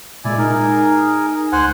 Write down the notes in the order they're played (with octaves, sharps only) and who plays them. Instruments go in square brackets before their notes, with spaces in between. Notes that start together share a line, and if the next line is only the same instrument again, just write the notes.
[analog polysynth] A#2 G#3 [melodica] E4 D5 G#5
[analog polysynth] D#4 [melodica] G#4 A#4
[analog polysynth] C#2 [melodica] C5 F#5 G#5